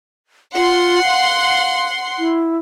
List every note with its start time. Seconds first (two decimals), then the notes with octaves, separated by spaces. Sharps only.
0.55 F4 F#5 C6
1.04 F5
2.19 E4